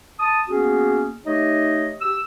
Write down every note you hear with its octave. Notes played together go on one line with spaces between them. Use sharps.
A5 D#6
A#3 B3 C#4 F#4 G#4
A3 D#4 G4 C#5 D#5
G4 E6